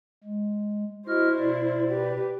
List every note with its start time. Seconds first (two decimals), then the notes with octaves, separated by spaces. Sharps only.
0.24 G#3
1.08 E4 F#4 C5 D#5 F6
1.39 B2 D5
1.91 G4 B4